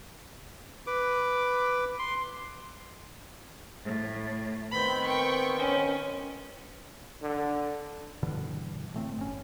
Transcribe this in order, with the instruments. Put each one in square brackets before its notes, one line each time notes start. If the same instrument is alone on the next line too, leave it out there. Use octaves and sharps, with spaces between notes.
[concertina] B4 D6
C6
[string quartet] A2
[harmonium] D#3 B3 C4 [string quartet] B5 G6
[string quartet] G5 C#6
C#4
[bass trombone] D3
[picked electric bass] G2 B2 D3 E3
A2 A3 C4
G1 C#4